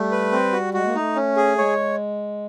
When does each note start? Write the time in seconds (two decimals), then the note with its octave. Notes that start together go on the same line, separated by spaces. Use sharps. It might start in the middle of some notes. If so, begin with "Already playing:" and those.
Already playing: G3 A3
0.11 B4
0.32 C4
0.52 F#4
0.74 G#3 F#4
0.86 A#3
0.95 A3 D#4
1.16 C#4
1.37 G#4
1.58 G#3 C#5